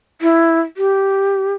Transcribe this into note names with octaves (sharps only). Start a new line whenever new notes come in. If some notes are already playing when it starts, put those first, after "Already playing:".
E4
G4